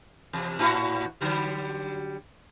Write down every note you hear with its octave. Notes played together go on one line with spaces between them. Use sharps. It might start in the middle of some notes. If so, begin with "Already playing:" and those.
E2 C3
A2 E4 F#4
D3 F#3 G3